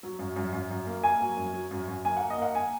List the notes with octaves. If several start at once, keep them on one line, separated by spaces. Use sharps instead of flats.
F#3
F#2
F#2
F#2
F#2
A#3
A#3 G#5
F#3
F#2
F#3
F#2
F#2
A#3 G#5
A#3 F#5
D#5
A#3 F#5
A#3 G#5